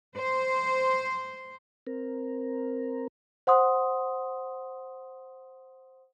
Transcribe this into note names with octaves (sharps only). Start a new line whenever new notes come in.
C5
C4 A#4
C5 F#5 C6 D#6